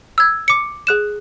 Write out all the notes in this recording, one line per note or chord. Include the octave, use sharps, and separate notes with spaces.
E6 G#6
D6 C#7
G#4 F#6 E7